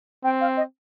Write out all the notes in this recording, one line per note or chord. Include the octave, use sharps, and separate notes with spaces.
C4 G5
F5
D#5